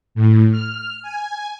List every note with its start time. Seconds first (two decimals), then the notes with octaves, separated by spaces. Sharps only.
0.15 A2
0.51 F6
1.02 G#5